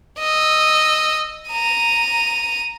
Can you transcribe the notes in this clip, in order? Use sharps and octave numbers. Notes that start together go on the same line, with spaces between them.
D#5 E6
A#5 D#7